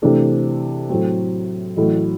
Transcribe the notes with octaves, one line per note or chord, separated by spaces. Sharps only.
C3 E3 A3 D4 A4
A2 F#3 C4
A1 A2 F#3